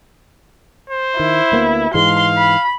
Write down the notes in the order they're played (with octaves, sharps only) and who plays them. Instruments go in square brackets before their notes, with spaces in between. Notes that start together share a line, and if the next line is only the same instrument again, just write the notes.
[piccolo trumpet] C5
[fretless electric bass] D#3 [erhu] E4
[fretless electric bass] D2 A#3 B3
[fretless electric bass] G#2 E3 G#3 [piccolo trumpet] F5 [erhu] C6
[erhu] B5